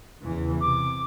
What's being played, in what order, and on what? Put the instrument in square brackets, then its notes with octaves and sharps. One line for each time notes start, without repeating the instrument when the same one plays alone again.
[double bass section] E2 C#3 E3
[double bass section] C3 [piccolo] D6